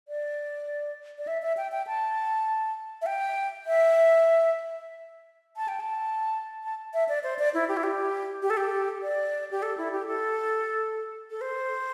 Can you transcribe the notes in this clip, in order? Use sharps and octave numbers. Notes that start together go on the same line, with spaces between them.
D5
D5
E5
E5
G5
G5
A5
E5
G5
E5
A5
G5
A5
A5
E5
D5
C5
D5
E4
G4
E4
G4
G4
A4
G4
D5
G4
A4
E4
G4
A4
A4
C5